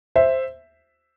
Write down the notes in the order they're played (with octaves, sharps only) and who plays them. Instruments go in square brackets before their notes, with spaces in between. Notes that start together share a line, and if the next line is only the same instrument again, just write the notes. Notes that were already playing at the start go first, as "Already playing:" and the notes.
[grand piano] C5 E5